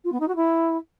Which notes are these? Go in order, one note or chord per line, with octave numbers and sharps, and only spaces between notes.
F4
B3
D#4
F#4
E4